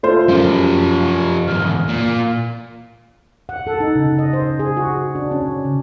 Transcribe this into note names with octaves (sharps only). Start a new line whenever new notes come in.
A3 F4 C5
F#2 F3 G4
E2 G#2 F6
A#2
F#5
A4
D#4
C#3
D#5
C5
G#4
F#4
D4
C#4
C#3